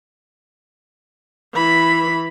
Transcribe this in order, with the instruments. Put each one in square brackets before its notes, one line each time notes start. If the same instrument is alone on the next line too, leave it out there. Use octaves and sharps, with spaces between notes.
[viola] E3 B5